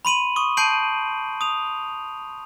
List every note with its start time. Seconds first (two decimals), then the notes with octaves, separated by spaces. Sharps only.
0.05 B5 C6 D#7 F#7
0.36 C#6 D#6
0.57 A5 G6 C7 D7 D#7 F#7
1.41 D#6 F7